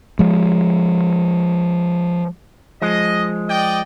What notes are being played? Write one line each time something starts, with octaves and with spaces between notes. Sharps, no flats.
F3 G#3
F3 G#3 D#5
D5 D#5 G5